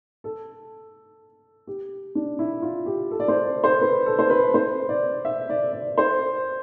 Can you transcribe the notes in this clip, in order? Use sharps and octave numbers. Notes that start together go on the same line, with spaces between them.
A4
G4
D4
E4
F4
G4
A4
D5
C5
D5
C5
B4
A4
C5
B4
C5
D5
E5
D5
D5
C5